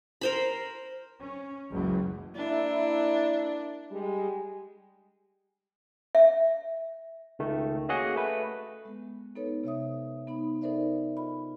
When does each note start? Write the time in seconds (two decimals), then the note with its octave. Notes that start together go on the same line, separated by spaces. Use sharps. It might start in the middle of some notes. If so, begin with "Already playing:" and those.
0.21 A#4 C5 B5
1.22 C#4
1.71 F#1 C#2 E3 F#3 G#3
2.36 A#3 D4 E4
3.91 G3 G#3
6.15 E5
7.39 C#2 D#3 A3
7.88 A#3 C#4 F#4 G#4 D#5 F#5
8.16 A3 B4
8.85 G#3 B3
9.36 B3 D#4 A4 B4 C#5
9.64 C3 C#5 E5 D#6
10.27 B3 D#4 B5
10.61 D#4 A4 A#4 C5 D5 E5
11.17 F4 D#5 B5